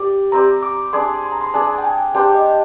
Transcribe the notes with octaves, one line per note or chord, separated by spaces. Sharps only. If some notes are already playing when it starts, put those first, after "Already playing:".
Already playing: G4 D5
C4 G4 D5 A#5
D6
D4 G#4 D5 C6
C6
A#5
C6
D4 G#4 D5 G#5
G5
G#5
D4 G4 C5 G5
D#5